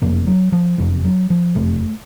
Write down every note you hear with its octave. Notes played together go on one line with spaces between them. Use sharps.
F#1 F2 C3 A#3
F#3
F3
F#1 F2 C3 F3
F#3
F3
F#1 F2 C3 A3